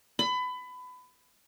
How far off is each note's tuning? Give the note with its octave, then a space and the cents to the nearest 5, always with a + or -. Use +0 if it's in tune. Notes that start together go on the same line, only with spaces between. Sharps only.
B5 +25